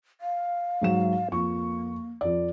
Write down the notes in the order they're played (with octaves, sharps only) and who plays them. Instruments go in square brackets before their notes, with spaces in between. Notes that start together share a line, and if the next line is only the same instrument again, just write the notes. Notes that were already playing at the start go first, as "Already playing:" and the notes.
[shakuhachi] F5
[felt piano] G#2 F#3 E7
[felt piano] F2 C#6 [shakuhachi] A#3
[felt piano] F2 D5